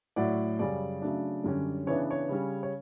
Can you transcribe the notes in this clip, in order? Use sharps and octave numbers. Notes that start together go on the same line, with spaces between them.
A2 F#3 A3 D5 F#5
F#2 C#3 G3 D5
C#3 F#3 A3 D4
F#2 D3 G3 C#4
C#3 E3 B3 D4 C#5
C#5
C#3 G3 C#4
C#5